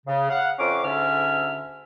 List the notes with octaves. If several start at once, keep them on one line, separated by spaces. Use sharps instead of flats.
C#3
F5 F#5
F2 C#4 F5 D6
D2 G#2 D3 C#4 E5 F6